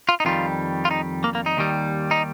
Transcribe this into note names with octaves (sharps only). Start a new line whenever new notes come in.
F4
D#4
F2 D#3 G3 F4
F4
D#4
A#3
A#3
D#4
D#2 D#3 G3
D#4